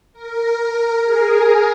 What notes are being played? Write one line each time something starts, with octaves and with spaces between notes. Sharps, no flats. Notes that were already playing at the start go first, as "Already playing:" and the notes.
A#4
G#4